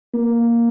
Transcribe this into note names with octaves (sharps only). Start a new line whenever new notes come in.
A#3